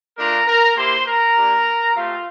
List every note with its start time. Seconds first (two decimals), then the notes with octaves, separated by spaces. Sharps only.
0.17 A3 D4 F4 A#4 A#5
0.46 A#4 A#5
0.75 A#3 E4 G4 C5 C6
1.05 A#4 A#5
1.35 A#3 D4 G4
1.93 A3 C4 F4 G4 F5